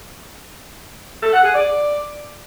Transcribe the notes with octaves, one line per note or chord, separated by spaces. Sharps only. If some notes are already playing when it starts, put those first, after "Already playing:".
A4
F#5
G#4
D5